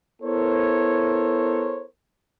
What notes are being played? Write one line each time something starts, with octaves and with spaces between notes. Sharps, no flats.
B3 E4 A4 A#4 C5 C#5